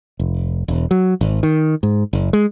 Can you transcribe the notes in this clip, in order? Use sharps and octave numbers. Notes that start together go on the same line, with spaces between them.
F1
E1
F#3
G#1
D#3
G#2
F#1
G#3